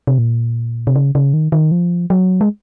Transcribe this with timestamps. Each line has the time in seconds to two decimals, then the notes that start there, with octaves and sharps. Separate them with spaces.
0.07 C3
0.18 A#2
0.87 C3
0.96 C#3
1.15 C#3
1.34 D#3
1.52 D#3
1.71 F3
2.10 F#3
2.41 G#3